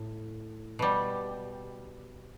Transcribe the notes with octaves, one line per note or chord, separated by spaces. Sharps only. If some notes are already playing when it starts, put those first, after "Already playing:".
Already playing: A2
B2 G3